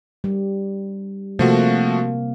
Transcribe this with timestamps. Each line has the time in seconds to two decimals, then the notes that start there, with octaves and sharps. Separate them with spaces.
0.24 G3
1.39 C3 F3 A3 A#3 F#4